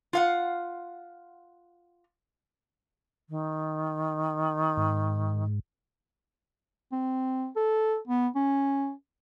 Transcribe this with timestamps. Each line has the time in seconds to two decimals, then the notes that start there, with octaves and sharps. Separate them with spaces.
0.13 F4 F5 F#5
3.29 D#3
4.77 G#2
6.92 C4
7.56 A4
8.07 B3
8.36 C#4